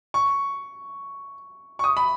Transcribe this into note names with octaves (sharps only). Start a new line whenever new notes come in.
C#6
C#6
D#6
B5